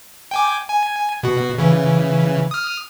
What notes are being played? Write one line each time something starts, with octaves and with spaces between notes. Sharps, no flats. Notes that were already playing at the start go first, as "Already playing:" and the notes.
G5 G#5 D6
G#5
B2 F#4
C#3 E3
D#6 F6